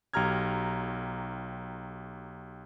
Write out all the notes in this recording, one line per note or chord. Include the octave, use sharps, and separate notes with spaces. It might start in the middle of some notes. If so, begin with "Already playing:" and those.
B1 G4 A#5 F6 G#6